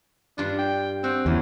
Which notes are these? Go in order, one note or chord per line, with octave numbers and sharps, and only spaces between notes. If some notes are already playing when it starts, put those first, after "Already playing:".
G2 D4 F4
G5
C4 F#4
E2 C#4